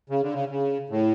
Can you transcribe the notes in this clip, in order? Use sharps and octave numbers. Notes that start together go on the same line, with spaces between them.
C#3
D3
C#3
C#3
A2